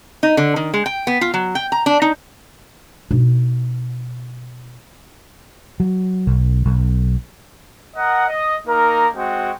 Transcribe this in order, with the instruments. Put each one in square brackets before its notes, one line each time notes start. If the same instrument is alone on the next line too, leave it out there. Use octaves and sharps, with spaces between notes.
[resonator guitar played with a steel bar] D#4
D3
D#3
G#3
G5
B3
F4
F#3
G5
A#5
D4
D#4
[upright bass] B2 D#4
[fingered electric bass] F#3
B1
B1
[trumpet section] A#4 D#5 F#5
D#5
A#3 D#4 A#4
G#3 C4 F#4 G5